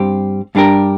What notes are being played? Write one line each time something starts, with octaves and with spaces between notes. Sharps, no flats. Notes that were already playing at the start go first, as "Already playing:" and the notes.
Already playing: G2 G3 C4 G4
G2 G3 D4 G4 A#4